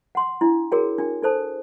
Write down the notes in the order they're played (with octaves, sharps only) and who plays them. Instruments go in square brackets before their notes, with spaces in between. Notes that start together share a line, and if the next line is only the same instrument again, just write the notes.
[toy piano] F#5 C6
D4 E4
F#4 G#4 A#4 C#5 G5
D4 G5
D4 A4 C5 A5